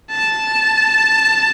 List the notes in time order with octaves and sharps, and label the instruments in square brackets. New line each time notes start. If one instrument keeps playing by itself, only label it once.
[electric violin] A5